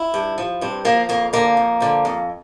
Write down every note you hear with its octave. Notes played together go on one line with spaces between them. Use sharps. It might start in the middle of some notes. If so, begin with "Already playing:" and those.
Already playing: E4
G2
F3
G2 C4
F3 A#3
F2 A#3
D3 F3 A#3
F2
D3 F3
F2